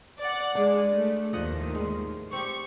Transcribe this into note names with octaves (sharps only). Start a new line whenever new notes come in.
D5 F#5
G#3 D4
A3
D#2 A2 D#3 F3 D#5 F#5
G#3
C4 G4 C#6